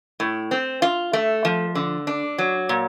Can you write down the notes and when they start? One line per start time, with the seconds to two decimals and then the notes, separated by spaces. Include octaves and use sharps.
0.20 A2
0.51 C4
0.82 F4
1.13 A3
1.45 F3
1.75 D3
2.07 D4
2.38 F#3
2.69 A#2